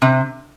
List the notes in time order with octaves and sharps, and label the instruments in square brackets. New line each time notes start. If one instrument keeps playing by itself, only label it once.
[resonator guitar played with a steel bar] C3